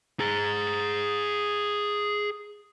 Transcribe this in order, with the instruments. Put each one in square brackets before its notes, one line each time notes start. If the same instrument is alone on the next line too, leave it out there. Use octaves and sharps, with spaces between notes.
[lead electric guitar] G#4 A#5